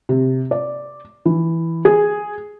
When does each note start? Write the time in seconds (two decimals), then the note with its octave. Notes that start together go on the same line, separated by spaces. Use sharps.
0.09 C3
0.51 D5
1.25 E3
1.85 G#4